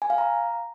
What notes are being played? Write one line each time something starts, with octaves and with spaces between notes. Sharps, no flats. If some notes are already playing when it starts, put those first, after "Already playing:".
G#5
F5
A#5